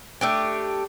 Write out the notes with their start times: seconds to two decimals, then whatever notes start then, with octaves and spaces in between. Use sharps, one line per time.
0.21 A3 D4 G4